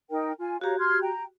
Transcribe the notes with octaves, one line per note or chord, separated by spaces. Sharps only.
D#4 A#4 G5
F4 G#5
F#4 G4 C#5 F5 A#5
C6 F6 G#6
G5 A#5